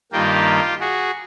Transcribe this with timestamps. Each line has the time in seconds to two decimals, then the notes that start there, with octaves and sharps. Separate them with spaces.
0.12 G2 D#3 G3 A#3 F4 G4
0.80 F#4 G#4